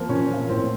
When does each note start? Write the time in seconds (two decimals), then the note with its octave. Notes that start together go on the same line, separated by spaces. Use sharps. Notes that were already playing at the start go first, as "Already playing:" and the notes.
Already playing: F3 A#3 C4
0.09 A#2 C#4
0.29 F3 A#3
0.49 A2 C4